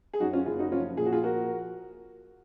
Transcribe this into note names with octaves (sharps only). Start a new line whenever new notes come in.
G#4
F#2 D#4 F#4
C#4 F4
F#1 F4 G#4
D#4 F#4
F3 C#4 F4
A#2 G#4
F#4
F4 G#4
F3 F#4 A#4